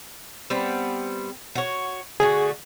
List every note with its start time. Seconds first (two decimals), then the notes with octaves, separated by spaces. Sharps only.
0.50 G3 B3 C4
1.55 F#4 C#5
2.20 D3 A3 F#4 G#4